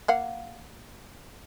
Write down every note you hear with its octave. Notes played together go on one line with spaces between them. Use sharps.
A#3 F5 F#5